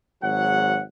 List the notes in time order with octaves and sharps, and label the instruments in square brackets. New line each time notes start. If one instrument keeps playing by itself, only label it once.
[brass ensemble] G#1 G#2 F#3 F#5